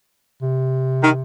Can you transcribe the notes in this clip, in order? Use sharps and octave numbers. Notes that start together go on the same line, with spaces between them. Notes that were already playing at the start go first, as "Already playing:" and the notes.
C3
D#3